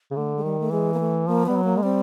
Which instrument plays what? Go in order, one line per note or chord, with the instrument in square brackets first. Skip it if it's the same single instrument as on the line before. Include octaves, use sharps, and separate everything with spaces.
[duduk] C#3
[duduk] D3 [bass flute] A3
[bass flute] G#3
[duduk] D#3 [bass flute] G3
[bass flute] A3
[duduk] E3 [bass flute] G#3
[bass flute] A#3
A3
[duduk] F3 [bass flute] A#3
[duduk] G3 [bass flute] B3
[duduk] F#3
[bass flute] A#3
[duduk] G#3
[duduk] G3 [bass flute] C4